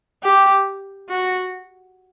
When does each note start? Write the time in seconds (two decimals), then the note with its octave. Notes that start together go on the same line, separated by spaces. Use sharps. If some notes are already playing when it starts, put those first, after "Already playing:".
0.23 G4
1.09 F#4